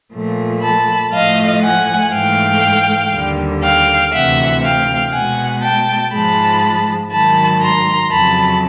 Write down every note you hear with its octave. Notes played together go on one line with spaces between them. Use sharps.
A#2 F3 A3
A5 B5
A2 F3 A3 D#5 F5
F#5 G#5
G#2 E3 A3 F5 G5
D#2 D3 G3
F5 G5
D2 C3 E3 E5 F#5
F5 G5
B2 G#3 F#5 G#5
G5 A5
G#2 F3 G#3 A5 B5
G#2 D#3 F#3 A5 B5
A#5 C6
F2 C#3 F#3 A5 B5